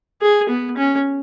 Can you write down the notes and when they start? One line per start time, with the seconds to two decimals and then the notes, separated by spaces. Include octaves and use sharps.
0.22 G#4
0.49 B3
0.77 C#4